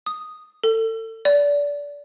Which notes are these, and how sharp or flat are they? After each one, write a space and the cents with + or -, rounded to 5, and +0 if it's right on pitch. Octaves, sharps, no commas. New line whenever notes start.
D#6 +0
A4 +30
D5 -25